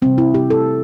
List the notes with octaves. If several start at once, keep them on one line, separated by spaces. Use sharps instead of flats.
C3 E3 G3 C4
E4
G4
A4